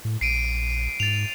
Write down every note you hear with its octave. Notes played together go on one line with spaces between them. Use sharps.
A2
A#1 C7 D7 D#7
G#2 A6 F7